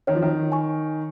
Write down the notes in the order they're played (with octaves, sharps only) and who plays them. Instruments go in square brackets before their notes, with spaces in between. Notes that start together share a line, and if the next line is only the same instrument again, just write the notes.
[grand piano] D#3 [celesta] C#5
[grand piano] F3
D#3
[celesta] G#5 C#6